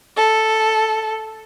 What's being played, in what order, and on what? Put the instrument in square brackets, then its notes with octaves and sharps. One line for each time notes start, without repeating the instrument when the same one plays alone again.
[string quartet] A4